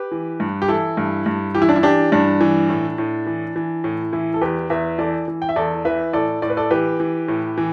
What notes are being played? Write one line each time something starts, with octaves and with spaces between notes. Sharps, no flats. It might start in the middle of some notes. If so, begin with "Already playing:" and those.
Already playing: G4 B4
E3
G2
G4
E3 E4 A4
G2
G2
E3 G4
E4
D4
E4
E3 D4 G4
G2 D4
E3
A2
A2
E3
E3
A2
E3 E4
A4
E2 G4 B4
E2 B4 E5
E3 A4 D5
E3
G5
E5
E2 A4 D5
E3 B4 E5
A2 A4 D5
A2 D5
B4
A4 D5
E3 G4 B4
E3
A2
E3